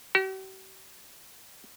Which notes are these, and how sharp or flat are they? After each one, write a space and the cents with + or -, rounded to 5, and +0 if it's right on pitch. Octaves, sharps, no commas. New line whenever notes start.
G4 -45